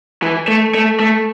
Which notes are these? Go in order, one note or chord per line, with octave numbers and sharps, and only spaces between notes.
E3
A3
A3
A3